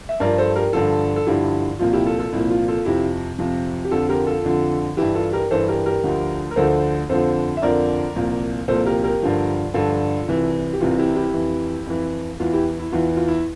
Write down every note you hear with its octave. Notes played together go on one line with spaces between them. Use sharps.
E5
G2 F3 A#4 D5
A4 C5
G4 A#4
G2 D3 F3 F4 A4
A4
G2 D3 F3 E4 G4
C2 A#2 F3 F4
E4 G4
F4 A4
F4 A4
C2 A#2 F3 E4
F4
F4 A4
F2 C3 F3 E4 G4
F2 C3 F3
G4
F2 D3 F3 F4 A4
G4 A#4
F4 A4
F2 D3 F3
G2 E3 E4 G4
F4 A4
G4 A#4
G2 E3 A4 C5
G4 A#4
G4 A#4
D2 D3 F3
A#4
D2 D3 F3 A4 C5
F2 D3 F3 A4 C5
E5
F2 D3 F3 A#4 D5
C2 A#2 F3
C2 A#2 F3 A4 C5
G4 A#4
G4 A#4
G2 D3 F3
G2 D3 F3 F4 A4
C2 C3 E3
G4
C2 C3 E3 F4
E4 G4
E4 G4
F2 E3
F2 E3
E2 E3 F4
E4 G4
E4
E2 E3 F4
F4
E4